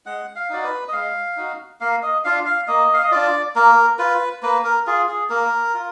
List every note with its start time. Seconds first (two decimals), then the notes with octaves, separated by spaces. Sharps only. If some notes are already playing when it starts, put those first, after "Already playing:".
0.06 G#3 F#5
0.35 F5
0.50 D#4 F#4 D5
0.64 B4
0.88 D#5
0.93 G#3 F5
1.37 D#4 F#4
1.80 A#3 F5
2.03 D#5
2.25 D4 F4 F5
2.46 F5
2.67 A#3 D#5
2.93 F5
3.02 D#5
3.12 D4 F4 D5
3.56 A#3 A#4
3.99 F4 B4
4.43 A#3 B4
4.64 A#4
4.87 F4 G#4
5.08 G#4
5.30 A#3 A#4
5.74 F4